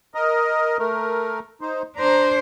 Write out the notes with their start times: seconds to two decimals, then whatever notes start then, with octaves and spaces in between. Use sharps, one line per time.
0.14 A#4 D#5
0.79 A3 A#4
1.61 D#4 C5
1.96 D4 C5 A#5